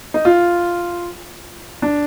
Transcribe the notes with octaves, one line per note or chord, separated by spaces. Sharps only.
D#4
F4
D4